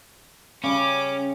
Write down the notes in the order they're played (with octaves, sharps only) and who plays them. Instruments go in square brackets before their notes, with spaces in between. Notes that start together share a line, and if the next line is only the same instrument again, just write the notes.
[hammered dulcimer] C#3 G3 [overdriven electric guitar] C#4 [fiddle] D6